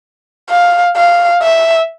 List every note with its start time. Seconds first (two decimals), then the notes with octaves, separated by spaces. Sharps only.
0.50 F5
0.97 F5
1.42 E5